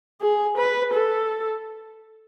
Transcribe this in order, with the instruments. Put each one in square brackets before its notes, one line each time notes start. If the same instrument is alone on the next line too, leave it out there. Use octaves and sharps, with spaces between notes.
[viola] G#4
B4
A4